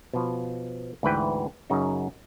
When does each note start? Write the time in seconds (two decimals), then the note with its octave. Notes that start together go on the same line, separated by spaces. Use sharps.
0.13 B2 F3
1.03 D2 G#2 E3 B4 G5
1.70 F#2 C#3 D#4